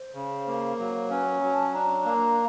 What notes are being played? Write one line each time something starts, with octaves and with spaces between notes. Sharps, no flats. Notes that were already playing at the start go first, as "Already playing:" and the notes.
Already playing: C5
C#3
A#3
F#3
C#4 B4
F#3
A5
D4 A#5
A#3